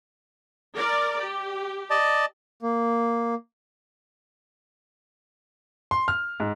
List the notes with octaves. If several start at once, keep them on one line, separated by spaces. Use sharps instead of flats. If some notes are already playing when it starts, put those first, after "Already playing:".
A#4 D5
G4
D5 D#5 A5
A#3
C6
F6
G#2